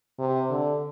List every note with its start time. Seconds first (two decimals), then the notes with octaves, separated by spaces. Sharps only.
0.19 C3
0.50 D3